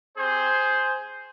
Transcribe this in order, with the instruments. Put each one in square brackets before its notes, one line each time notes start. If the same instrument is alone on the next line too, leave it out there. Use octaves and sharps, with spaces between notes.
[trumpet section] C4 G4 G#4 C5